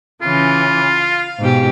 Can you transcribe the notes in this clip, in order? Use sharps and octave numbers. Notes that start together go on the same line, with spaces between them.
C#3 E3 C#4 F4
F5
G#2 B2 G4